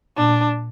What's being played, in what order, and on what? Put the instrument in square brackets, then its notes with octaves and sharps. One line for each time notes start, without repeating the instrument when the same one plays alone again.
[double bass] A#2 [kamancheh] D4